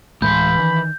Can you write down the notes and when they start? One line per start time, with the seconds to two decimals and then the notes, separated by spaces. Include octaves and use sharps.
0.22 D1 A2 E3 G#3 B5 C6 G6
0.59 D#3